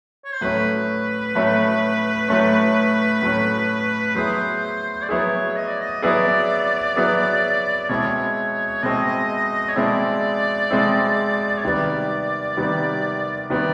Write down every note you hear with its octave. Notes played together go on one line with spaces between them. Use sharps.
C#5
C5
A2 F#3 A3 C#4 B4
A2 F#3 A3 C#4
A2 F#3 A3 C#4
A2 F#3 A3 C#4
F#3 B3 E4 G#4 C5
D5
F#3 B3 E4 G#4 C#5
D#5
D5
D#5
F#3 B3 E4 G#4 D5
F#3 B3 E4 G#4
B2 G#3 C4 E4 C#5
B2 G#3 C4 E4 D#5
C#5
B2 G#3 C4 E4 D5
B2 G#3 C4 E4
C#5
C3 D#3 G3 B3 D5
C3 D#3 G3 B3
C3 D#3 G3 B3 D5